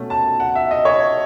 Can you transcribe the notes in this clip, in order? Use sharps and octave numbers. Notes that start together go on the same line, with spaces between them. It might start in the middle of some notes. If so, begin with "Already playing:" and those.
Already playing: B2 A3 C#4
A5
F#5
E5
D#5
C#5